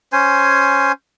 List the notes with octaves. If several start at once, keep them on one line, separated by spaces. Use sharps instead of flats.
C#4 C5 G#5